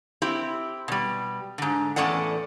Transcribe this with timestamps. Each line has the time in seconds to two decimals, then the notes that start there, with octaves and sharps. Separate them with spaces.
0.22 C4 E4 G4
0.88 B2 G3
1.58 G#2 D3
1.96 E2 A2 C#4 A4 D5 F#5